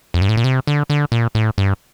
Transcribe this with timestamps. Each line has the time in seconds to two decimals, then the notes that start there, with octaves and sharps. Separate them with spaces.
0.14 F2
0.22 G2
0.29 A2
0.37 A#2
0.44 C3
0.67 D3
0.90 D3
1.12 A#2
1.35 A2
1.58 G2